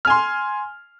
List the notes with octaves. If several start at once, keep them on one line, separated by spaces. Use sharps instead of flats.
G#5 C6 F6